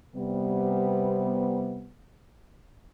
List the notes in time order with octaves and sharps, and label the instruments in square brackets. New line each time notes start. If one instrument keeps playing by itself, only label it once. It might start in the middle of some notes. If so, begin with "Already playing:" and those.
[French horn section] C3 G3 B3